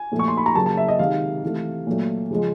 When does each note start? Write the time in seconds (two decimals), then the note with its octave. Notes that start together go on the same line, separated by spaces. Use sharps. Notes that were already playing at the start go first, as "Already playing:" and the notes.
Already playing: G#5
0.12 A#2 F3 A3
0.19 C#6
0.28 C6
0.37 B5
0.46 A#5
0.55 C#3 F#3 A#3 A5
0.66 A5
0.77 E5
0.88 D#5
0.99 C3 D#3 G#3 F5
1.43 C3 E3 A3
1.87 A#2 F#3 A3
2.31 C#3 F3 G#3